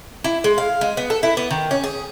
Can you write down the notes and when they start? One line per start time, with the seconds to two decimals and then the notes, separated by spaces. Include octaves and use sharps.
0.24 E4
0.44 G#3
0.58 F5
0.81 G#3
0.97 B3
1.10 A4
1.23 E4
1.37 B3
1.51 D#3
1.71 C#4
1.84 G#4